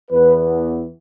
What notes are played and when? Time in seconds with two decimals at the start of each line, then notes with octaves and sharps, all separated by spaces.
0.11 E2 E3 B3 B4